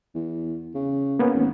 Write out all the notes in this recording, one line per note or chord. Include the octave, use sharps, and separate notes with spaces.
E2
C#3
A#3 B3 C#4
G#1